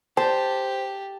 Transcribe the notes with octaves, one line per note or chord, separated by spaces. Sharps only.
G4 C5 A5